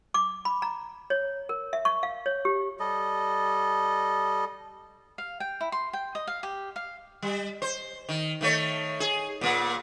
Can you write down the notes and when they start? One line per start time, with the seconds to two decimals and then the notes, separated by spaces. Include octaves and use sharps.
0.14 D6
0.45 B5
0.62 A#5
1.10 C#5
1.49 A#4
1.73 E5
1.85 C#6
2.03 F5
2.26 C#5
2.45 G4
2.80 G3 A4 D#5
5.18 F5
5.40 G5
5.61 E4
5.72 C6
5.93 G5
6.15 D#5
6.27 F5
6.43 G4
6.76 F5
7.22 G3
7.62 C5
8.09 D#3
8.41 D#3 A3 C#5
9.00 G#4
9.41 A#2 A#3